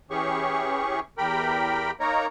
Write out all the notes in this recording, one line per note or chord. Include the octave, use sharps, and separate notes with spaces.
E3 C#4 G4 G#4 C#6
E2 G4 A#4 G5 B5
A#3 D#4 A#4 C#5 A#5